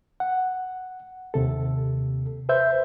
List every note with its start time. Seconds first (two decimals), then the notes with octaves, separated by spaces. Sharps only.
0.20 F#5
1.34 D#2 C3 A4
2.49 B4 C5 E5 G6